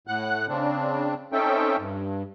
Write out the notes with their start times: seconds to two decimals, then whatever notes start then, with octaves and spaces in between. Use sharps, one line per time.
0.07 A2 F#5 F#6
0.49 C#3 C4 D4
1.33 C4 C#4 D#4 A4 E5 G5
1.78 G2